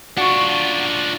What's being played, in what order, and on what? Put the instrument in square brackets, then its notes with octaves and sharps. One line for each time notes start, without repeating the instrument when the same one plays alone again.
[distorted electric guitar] D4 F4 [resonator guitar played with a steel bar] F#4